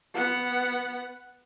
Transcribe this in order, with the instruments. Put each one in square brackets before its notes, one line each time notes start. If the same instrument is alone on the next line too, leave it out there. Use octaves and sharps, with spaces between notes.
[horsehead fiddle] B3 F#5